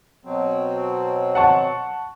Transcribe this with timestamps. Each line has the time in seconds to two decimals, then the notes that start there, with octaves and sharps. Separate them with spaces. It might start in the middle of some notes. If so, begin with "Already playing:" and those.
0.25 B2 F#3 C4
1.35 F#5 A5 C#6